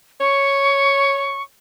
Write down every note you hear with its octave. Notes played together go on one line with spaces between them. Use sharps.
C#5 C#6